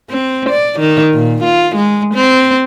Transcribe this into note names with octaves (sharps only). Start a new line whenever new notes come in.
C4
D5
D#3
A#2
F4
G#3
C4